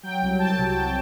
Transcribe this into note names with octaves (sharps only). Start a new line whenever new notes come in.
F#3 G5
C2
C2 A5
C3
F#3 G5